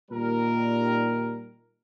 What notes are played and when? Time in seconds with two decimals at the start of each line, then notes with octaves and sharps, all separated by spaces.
0.11 A#2 D#3 G3 A#4